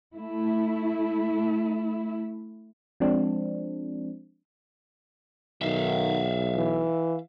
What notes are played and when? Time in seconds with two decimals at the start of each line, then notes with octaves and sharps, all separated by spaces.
0.17 A3 E4
3.00 F3 G#3 C4 D4
5.62 B1 D#3 E5 F5
6.55 E3